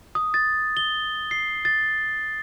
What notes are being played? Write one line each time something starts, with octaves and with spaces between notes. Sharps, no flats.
D#6
A6
G7
C7
A6